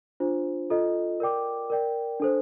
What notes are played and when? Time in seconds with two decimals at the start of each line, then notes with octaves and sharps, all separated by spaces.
0.20 D4 F4 C5
0.70 F4 A4 D#5
1.20 A#4 D5 G5 D6
1.70 A#4 D5 G5
2.20 D4 A4 C5